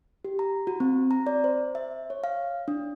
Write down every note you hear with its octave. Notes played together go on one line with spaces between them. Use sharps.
G4
A#5
F#4
C4
A#5
D5
C5
E5
C#5
F5
D4